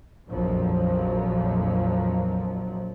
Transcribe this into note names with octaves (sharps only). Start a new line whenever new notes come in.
A#1 F2 A#2 F3 F#3